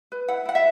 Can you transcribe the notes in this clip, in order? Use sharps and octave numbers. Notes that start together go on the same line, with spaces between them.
B4
E4 F#5
E4 F#5
E5